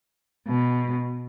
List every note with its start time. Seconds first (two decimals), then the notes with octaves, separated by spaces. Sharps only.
0.48 B2